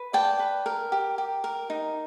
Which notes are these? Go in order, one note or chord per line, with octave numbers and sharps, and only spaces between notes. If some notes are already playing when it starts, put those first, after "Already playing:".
Already playing: B4
D5 G5 A5
B4
A#4
G4
G4
A#4
D#4